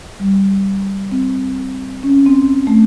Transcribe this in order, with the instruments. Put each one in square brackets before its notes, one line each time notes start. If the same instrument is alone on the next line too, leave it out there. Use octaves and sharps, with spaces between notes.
[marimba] G3
C4
C#4
C4
A3